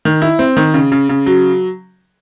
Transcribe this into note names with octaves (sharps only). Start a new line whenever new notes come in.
D#3
E4
C4
D#3
C#3
C#3
C#3
F#3